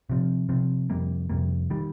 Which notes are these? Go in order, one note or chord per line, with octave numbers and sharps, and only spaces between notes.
C3 F3 C4
C3 F3 C4
F2 C3 G3 A#3
F2 C3 G3 A#3
D#3 G3